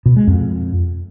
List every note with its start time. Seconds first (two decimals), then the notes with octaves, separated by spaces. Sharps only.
0.06 B2
0.16 G#3
0.27 F2